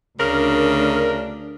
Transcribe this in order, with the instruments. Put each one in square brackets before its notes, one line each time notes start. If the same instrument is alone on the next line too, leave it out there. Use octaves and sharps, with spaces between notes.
[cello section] D2 D4 [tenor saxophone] C#3 [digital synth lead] A#4